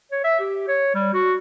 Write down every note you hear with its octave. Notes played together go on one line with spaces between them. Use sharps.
C#5
E5
G4
C#5
G3
F#4